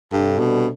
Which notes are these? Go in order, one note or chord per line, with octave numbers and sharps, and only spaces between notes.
G2 C3 G3 D4 A4
B2